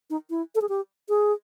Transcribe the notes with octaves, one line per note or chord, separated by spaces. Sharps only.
D#4
E4
A4
G#4
G4
G#4